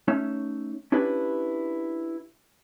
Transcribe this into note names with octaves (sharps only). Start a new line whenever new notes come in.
A3 C#4 D#4 C#5 E5
C#4 D4 E4 G4 B4